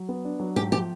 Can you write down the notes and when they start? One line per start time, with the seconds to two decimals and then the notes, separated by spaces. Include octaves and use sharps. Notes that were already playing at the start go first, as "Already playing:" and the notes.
Already playing: F#3
0.09 B3
0.25 D4
0.40 F#3
0.56 G#2 G4
0.72 F3 G4